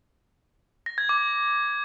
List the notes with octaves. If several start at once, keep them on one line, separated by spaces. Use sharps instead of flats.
A#6
G#6
D6